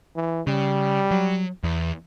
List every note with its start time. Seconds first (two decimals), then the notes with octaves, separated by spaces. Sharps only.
0.16 E3
0.47 C#3 G3
1.11 F#3
1.64 E2